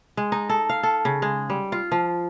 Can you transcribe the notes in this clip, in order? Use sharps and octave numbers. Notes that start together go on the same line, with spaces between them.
G#3
D#4
A4
F5
A4
C#3
G#3
G3
F4
F3